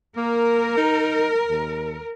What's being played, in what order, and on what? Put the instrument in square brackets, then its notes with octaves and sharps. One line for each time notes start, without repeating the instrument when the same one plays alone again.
[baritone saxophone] A#3 [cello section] A#4
[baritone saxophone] D#4
D#2